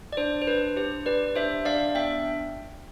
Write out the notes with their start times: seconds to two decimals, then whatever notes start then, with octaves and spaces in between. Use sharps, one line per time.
0.13 D5
0.17 D4 C5
0.42 C5
0.47 D4 B4
0.76 G4 C5
1.06 G4 B4 D5
1.36 D4 C5 E5
1.65 D4 D5 F5
1.95 B3 E5 G5